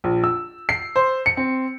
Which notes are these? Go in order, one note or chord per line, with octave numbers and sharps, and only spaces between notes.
A#1
E6
C7
C5
C#7
C4